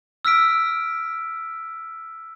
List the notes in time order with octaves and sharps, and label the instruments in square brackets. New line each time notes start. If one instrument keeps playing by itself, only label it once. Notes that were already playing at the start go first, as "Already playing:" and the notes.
[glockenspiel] E6 F6 B6 D7